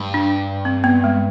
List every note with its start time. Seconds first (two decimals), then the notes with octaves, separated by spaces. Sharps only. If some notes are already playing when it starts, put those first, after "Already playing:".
Already playing: G2
0.14 D4
0.65 C4
0.84 B3
1.04 G#3